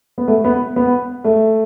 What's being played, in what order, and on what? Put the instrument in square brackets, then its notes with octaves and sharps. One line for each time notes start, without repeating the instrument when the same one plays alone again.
[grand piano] B3
A3
B3
B3
A3